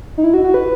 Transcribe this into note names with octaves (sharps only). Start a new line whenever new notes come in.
D#4
E4
F#4
F#4
B4